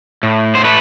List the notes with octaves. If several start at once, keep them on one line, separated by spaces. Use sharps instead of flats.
A2
C5
A3 B4